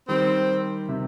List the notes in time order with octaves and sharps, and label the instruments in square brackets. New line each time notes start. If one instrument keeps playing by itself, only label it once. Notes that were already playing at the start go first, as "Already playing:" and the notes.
[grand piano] D#3 G3 [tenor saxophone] C4
[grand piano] C3